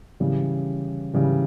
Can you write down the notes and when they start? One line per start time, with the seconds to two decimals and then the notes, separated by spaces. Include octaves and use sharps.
0.20 C#3 E3 G3
1.14 C#3 E3 G3